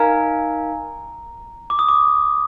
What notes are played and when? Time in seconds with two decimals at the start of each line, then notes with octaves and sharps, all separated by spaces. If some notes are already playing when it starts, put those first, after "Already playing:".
Already playing: D#4 A#4 F5 G#5 A#5
1.70 D6
1.79 D#6
1.89 D6